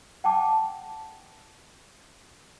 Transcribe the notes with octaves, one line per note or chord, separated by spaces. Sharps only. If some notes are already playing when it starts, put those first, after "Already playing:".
F#5 G5 A5 D6